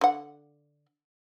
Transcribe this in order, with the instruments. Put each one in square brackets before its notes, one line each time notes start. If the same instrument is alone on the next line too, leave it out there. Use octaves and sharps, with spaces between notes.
[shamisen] D3 F#5